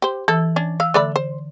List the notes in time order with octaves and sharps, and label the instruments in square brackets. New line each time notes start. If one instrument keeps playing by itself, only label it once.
[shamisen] G4 C5
[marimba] E3 [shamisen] A4
[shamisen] C#4 D4
[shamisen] F5 [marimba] E6
[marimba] D3 [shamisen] A3 D5 B5
[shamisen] C5